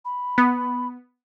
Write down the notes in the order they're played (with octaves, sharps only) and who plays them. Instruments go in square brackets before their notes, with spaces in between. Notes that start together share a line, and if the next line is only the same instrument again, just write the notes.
[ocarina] B5
[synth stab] B3